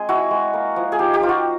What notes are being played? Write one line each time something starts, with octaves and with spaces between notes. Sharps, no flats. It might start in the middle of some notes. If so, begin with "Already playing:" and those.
Already playing: G#3 C4 G#4
E4 F#4
G#3
A#3
F3
G#4
D#4 G4
G4
F3 F4
F#4